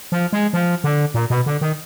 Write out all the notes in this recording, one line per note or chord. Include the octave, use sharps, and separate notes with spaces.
F3
G#3
F3
D3
A#2
B2
D3
D#3